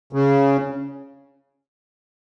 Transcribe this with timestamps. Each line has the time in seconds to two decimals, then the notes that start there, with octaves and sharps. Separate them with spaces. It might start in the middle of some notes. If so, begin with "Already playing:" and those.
0.13 C#3